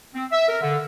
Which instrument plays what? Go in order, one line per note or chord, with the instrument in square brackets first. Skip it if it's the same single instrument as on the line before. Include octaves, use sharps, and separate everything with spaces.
[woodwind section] C4
E5
A#4
D3